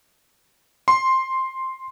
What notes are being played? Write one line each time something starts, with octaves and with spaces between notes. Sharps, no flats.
C6